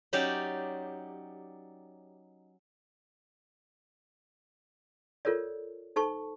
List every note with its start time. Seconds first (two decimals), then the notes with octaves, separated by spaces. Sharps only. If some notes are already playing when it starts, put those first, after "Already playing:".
0.13 F#3 C#4 D#4 G4 D5
5.25 F4 A4 A#4 C#5 D5
5.96 D#4 A4 C5 A5 C#6